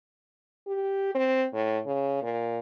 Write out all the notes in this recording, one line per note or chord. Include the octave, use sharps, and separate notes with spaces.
G4
C4
A2
C#3
A#2